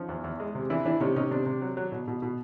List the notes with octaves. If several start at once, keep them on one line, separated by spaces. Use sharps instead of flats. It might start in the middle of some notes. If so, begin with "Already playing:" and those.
Already playing: F3 C#4 D#4
E2
E2
G#3
C3
E3 D4 E4
E3 D4 E4
C3 C#4 D#4
C3 C#4 D#4
C3 D4
C3
F#3
F#3
B2
B2
B2